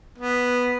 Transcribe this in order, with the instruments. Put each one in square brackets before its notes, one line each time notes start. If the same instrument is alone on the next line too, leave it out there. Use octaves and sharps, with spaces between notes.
[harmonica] B3